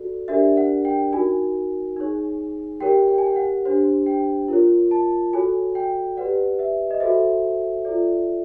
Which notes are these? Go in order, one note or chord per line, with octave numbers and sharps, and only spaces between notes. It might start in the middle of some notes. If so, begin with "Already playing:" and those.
Already playing: F#4 A4 D5
D4 G4 A#4 D5 E5
F#5
G5
D#4 F#4 A#4 G#5
D#4 G#4 C#5
G4 A#4 C#5 G5
G5
G#5
G5
F#5
D4 G4 C5
G5
F4 A#4 C#5
A5
F#4 A4 C#5 G#5
G5
G4 B4 D5 F#5
E5
D#5
F#4 A4 C5 E5
F4 A4 D5